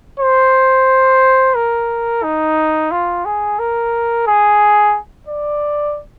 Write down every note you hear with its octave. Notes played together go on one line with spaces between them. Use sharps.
C5
A#4
D#4
F4
G#4
A#4
G#4
D5